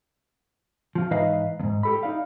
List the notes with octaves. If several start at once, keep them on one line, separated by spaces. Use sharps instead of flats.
F3 F4
G#2 E3 D#4 B4 D#5 F5
E2 G#2
G4 A4 B5
D#4 D5 F5